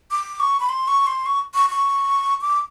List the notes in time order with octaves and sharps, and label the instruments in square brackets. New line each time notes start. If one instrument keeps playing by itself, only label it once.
[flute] D6
C#6
B5
C6
C#6
C6
C#6
C#6
C#6
D6